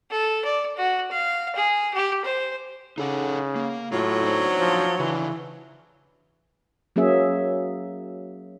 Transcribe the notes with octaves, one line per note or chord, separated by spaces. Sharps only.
A4
D5
F#4
F5
G#4
G4
C5
C#3 D#4 A4 F#5
A#3
A2 F#3 F4
D4 D#4 C5
F3
C#3 E3 D4
F#3 A#3 C#4 G#4 E5